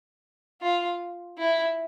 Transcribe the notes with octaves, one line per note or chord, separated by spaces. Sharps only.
F4
E4